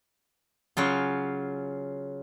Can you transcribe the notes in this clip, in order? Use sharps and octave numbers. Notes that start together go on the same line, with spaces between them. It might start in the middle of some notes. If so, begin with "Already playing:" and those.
C#3 F#3 F4